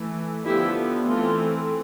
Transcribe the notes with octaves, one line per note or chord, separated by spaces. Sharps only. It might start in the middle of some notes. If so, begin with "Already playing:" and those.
Already playing: E3 A3
D3 F3 B3 D4 E4 G4
E3 A3 C4 F4 A4